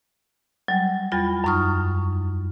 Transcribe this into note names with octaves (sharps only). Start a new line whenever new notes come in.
F#3 G3
E2 G3 F4 B5 A6
F#2 F#3 D#4 C#6 D#6 F6